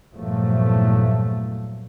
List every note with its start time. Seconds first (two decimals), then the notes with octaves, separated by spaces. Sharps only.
0.14 E2 G2 A#2 F3 F#3 A3